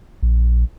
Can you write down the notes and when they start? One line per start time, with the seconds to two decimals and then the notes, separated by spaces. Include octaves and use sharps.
0.23 A#1